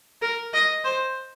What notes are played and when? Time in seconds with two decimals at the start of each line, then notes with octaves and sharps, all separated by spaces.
0.22 A#4
0.54 D#5
0.84 C5